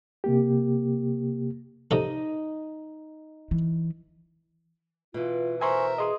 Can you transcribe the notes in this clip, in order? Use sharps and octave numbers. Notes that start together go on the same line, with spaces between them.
C3 A#3 G4
C3 D#4 A4 D#5
E3
B2 E3 F4
A#4 C5 E5 G#5 C6 C#6
G#4 D#5 C6 D#6